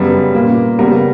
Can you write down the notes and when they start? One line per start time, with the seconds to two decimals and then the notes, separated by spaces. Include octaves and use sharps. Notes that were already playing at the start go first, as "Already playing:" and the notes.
Already playing: F#2 C#3 G3 B3 B4
0.35 A#2 A#3
0.79 C#3 G3 B3 A#4